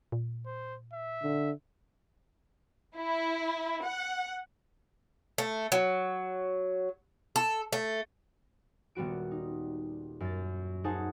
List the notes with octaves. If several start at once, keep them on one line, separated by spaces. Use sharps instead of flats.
A#2
C5
E5
D3
E4
F#5
A3
F#3
A4
A3
D#1 G3 B3 F#4 D7
D#4
F#2 A6
D#4 G#4 C5 F#5 G#5 A5